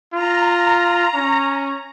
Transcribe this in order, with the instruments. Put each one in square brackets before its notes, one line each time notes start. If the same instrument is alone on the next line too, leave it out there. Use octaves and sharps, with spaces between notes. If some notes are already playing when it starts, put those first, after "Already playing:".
[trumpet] F4 [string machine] A#5
[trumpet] C#4